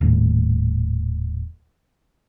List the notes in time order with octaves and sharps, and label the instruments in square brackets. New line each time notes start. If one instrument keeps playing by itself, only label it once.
[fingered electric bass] D#1 A2